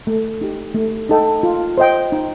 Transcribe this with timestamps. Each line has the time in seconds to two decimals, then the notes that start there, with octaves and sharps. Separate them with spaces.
0.07 A3
0.41 D#4 G4
0.75 A3
1.09 D#4 A4 D#5 G5
1.43 F4
1.78 C5 D#5 G5
2.12 D#4